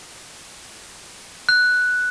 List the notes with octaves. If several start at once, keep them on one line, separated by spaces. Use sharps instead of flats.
F#6